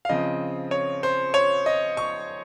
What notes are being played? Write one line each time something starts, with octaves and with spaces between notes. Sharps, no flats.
F5
C#3 F3 C4 D#5
C#5
C5
C#5
D#5
C#6